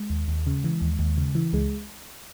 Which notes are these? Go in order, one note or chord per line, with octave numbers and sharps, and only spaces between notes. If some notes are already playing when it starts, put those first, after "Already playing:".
Already playing: G#3
D#2
D#2
C#3
E3
D#2
D#2
C#3
E3
C#2 G#3